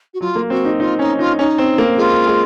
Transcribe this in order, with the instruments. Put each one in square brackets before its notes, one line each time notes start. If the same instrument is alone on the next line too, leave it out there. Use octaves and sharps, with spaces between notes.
[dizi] F#4
[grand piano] F#3 [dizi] F4
[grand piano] A#3
[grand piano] C4 [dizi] F#4
[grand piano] D#4
[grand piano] D#4 [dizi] F4
[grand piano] C#4 [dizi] D#4
[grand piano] D#4 [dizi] F4
[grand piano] C#4 [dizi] D#4
[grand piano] C4
A#3
[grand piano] G#3 [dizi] F4
[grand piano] G#3